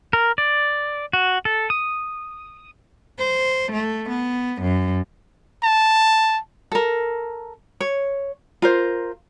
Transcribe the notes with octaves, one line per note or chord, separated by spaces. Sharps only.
A#4
D5
F#4
A4
D#6
C5
A3
B3
F#2
A5
A4 A#4
C#5
F4 A#4 C5